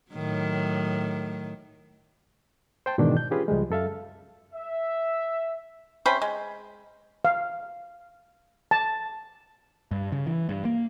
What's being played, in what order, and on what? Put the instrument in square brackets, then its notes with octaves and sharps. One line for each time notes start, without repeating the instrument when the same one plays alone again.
[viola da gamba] A2 D#3 F#3
[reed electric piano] C5 G5 A5
G#2 B2 D#3 E3 D4
G6
C#4 F4 G4 G#4 B4
C#2 F3 G3 G#3
F#2 A4 E5 F5
[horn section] E5
[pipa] C3 C#4 C5 B5
G#3
[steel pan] F5
A5
[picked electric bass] G2
C#3
E3
G2
A#3